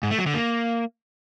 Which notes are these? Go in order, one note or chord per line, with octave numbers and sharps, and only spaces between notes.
G#2
A3
F#3
D3
A#3